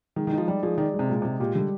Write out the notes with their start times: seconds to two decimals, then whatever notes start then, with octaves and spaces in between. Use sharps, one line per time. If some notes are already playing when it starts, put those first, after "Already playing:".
0.16 D#3 G#3
0.27 D#3
0.32 D#4
0.37 F3
0.48 G3 D5
0.63 F3 G#4
0.78 D#3 D5
0.94 G#3
0.99 C3
1.09 A#2 G#3
1.22 C3 G#3
1.40 A#2 G4
1.55 D3 G3